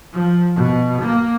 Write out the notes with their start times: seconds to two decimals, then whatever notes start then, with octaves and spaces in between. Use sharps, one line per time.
0.14 F3
0.56 B2
1.02 A#3